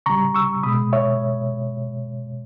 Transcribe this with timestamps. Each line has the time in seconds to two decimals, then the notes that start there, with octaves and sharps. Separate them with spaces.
0.06 C#3 G3 A#5 C#6
0.34 C#6 E6
0.63 B2 G#3 B5 D#6
0.93 C#5 E5